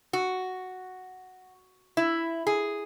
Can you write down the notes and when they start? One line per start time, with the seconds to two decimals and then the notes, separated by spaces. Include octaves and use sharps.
0.13 F#4
1.97 E4
2.47 G#4